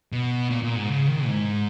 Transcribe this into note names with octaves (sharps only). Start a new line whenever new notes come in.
B2
A#2
A#2
G#2
C#3
D#3
G#2